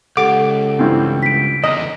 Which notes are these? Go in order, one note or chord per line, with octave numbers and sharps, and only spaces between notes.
C#2 G4 A4 F#5 D6
G2 E3 C4
B6 D7
E2 D3 D#5